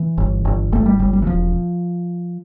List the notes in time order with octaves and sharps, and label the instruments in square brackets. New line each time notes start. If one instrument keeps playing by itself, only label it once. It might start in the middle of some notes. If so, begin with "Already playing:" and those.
Already playing: [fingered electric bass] E3
G1
G1
G1 A3
G3
G1 G3
G3
E3
E1 F3